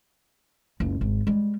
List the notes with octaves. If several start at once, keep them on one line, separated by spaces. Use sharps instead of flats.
F#1 C#2
G#1
G3 G#3